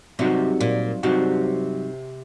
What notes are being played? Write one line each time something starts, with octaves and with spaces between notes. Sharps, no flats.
G2 C3 F#3 C4 D#4 F#4
A#2
G2 C3 F#3 C4 D#4 F#4